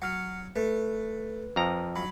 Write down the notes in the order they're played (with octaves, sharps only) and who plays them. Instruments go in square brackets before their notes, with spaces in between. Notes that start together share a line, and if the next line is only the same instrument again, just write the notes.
[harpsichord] F#3 [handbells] F#5 F6 C#7
[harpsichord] A3 [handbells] B4
[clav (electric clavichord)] F2 F3 A#5
[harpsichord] F#3 [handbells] B5